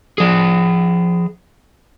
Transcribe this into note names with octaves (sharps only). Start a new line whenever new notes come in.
F3 G#4